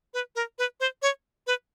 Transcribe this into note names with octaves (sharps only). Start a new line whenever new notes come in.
B4
A#4
B4
C5
C#5
B4